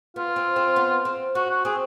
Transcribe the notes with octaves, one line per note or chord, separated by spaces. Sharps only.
B3 F4
C4
C4
B3
C4
C#4 F#4
F#4
C4 G#4